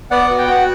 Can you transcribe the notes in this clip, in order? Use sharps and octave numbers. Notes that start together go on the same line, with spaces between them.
B3 D5 F#5
F#4
G5
F#4 F#5